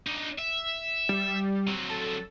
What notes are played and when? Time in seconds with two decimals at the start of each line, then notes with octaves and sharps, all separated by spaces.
0.07 D4 D#4
0.39 E5
1.09 G3
1.67 F#3 C4
1.90 A4